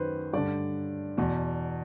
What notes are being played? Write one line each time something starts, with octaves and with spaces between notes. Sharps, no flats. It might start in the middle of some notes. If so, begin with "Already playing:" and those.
Already playing: F#2 D#3 B4 C5
G2 D3 D5
E2 B2